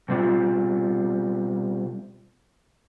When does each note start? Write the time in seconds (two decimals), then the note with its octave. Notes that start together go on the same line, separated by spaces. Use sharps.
0.09 B2 G3 C4 F4